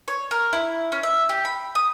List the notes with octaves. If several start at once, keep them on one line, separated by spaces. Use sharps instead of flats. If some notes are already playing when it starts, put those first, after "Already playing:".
C#5
A#4
E4
C#4
E5
G4
B5
D#6